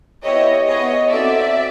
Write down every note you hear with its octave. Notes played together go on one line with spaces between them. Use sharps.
B3 E4 G4 C#5 D#5
B3 E4 G#4 C#5 D#5
C4 D#4 F#4 A4 D5 E5